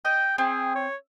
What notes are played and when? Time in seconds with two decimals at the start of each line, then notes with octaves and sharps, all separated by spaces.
0.05 D#5 G5
0.38 C4 G#4
0.76 C#5